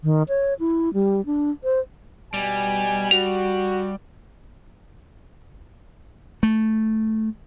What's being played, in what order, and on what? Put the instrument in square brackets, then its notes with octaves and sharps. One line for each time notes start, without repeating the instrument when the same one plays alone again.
[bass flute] D#3
C#5
E4
G3
D4
C5
[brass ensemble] B2 G#5 [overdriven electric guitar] G3
[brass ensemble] F#4 [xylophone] F7
[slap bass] A3